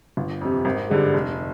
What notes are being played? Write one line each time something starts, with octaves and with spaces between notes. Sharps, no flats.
G1
F2 C3
G#1
G2 D3 G#3
F1